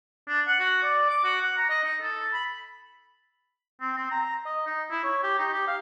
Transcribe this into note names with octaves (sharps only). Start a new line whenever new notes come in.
D4
F#5
F#4
D5
D6
F#4
F#5
A#5
D#5
D#4
A4
B5
C4
C4
A#5
D#5
D#4
E4
C#5
G4
D#4
G4
F5